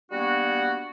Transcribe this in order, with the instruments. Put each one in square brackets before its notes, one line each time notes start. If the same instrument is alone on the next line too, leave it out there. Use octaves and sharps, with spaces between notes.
[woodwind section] G3 A#3 B3 D4 F#4